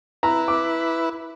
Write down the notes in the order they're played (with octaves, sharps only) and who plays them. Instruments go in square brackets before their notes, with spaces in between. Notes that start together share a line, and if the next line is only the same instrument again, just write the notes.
[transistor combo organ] E4 B4 [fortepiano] A#5
[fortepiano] D6